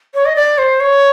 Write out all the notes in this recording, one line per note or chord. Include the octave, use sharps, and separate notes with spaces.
C#5
D#5
D5
C5
C#5